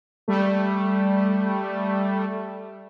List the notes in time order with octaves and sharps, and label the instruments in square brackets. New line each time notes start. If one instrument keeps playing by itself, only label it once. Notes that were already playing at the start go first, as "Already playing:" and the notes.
[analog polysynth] G3 A3